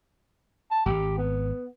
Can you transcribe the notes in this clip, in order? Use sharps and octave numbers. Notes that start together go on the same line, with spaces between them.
A5
D#1 G#1 G4
B3